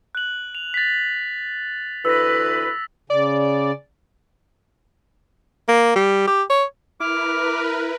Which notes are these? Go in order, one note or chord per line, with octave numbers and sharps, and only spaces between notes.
F#6 F#7
F7
A6 B6
D2 E3 B4 E6 A#6
C#3 D5
A#3
G3
G4
C#5
E4 A#4 B4 D6 F6